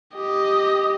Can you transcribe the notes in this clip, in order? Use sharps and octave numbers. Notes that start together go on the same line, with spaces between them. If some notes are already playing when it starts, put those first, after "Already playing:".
G4 D#5